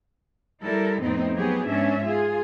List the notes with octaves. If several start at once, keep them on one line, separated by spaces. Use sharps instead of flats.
G3 E4 A4 A#4
F2 A2 B3 C4 D#4
F#3 B3 G4 G#4 B4
G#2 B3 C#4 D4 E5
F4 G#4